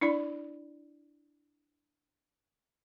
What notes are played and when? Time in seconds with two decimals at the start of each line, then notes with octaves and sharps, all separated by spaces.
0.01 D4 E4 D5 B5